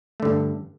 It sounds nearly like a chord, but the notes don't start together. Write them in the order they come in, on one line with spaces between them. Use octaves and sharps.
A3 D3 G2